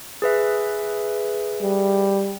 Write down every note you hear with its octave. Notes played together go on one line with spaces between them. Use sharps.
G#4 B4 E5
G3